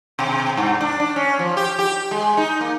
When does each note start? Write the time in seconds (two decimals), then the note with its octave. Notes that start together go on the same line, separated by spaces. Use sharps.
0.19 B2
0.57 G2
0.81 D4
1.00 D4
1.16 C#4
1.39 F3
1.57 G4
1.79 G4
2.11 G#3
2.37 D#4
2.61 A#3